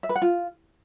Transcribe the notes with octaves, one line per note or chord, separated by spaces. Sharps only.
E5
B4
F#5
F4